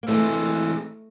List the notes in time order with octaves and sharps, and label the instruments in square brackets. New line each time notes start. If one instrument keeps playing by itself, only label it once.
[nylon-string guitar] A#3
[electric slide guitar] E3 G#3 C4 [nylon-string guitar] A3